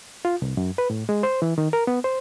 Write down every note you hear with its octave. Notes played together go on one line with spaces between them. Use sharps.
F4
C2
F#2
B4
A2
G#3
C5
E3
D#3
A#4
B3
C5